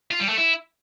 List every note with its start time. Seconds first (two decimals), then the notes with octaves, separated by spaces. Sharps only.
0.11 F4
0.20 G3
0.29 A3
0.38 E4